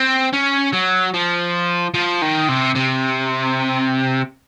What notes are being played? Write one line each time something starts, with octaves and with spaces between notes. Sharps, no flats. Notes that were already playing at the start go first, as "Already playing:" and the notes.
Already playing: C4
C#4
F#3
F3
F3
D#3
C3
C3